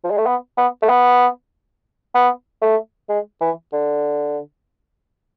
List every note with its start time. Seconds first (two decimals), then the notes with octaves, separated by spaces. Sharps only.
0.04 F3
0.11 G#3
0.18 A3
0.26 B3
0.57 B3
0.82 A3
0.89 B3
2.15 B3
2.62 A3
3.09 G#3
3.41 E3
3.73 D3